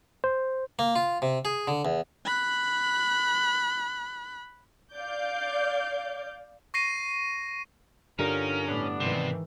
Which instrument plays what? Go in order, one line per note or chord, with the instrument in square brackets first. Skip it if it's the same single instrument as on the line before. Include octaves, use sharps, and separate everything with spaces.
[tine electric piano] C5
[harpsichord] A#3
F4
C3
G#4
D3
E2
[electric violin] B5 F#6
[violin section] D5 F5 D6 G6
[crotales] C#6 A#6 C7 D#7
[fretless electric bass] G2 D3 G3 [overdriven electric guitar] C#4 [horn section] D#4 F4 A#4
[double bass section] A2 [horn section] B3 D4
[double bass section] G#2 D#3 E3 [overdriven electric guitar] C3